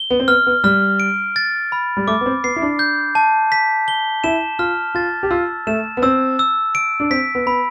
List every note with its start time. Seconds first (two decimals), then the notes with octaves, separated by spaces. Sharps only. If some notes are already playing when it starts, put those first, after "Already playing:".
Already playing: G7
0.10 B3
0.20 C4
0.28 B3 F6
0.47 B3
0.64 G3 F6
1.00 D7
1.36 A6
1.72 B5
1.97 G3
2.07 A3 D6
2.21 B3
2.26 C4
2.44 B3 C7
2.56 E4
2.62 D4
2.79 G6
3.15 A5
3.52 B6
3.88 G7
4.24 E4 E7
4.59 F4 F6
4.95 F4 A6
5.23 G4
5.31 F4 E6
5.67 A3 E7
5.97 B3
6.02 C4 E6
6.39 E6
6.75 D7
7.00 D4
7.11 C4 B6
7.35 B3
7.46 B3 B5